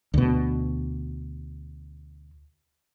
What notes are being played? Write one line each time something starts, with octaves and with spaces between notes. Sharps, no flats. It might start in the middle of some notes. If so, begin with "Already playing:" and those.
D2 B2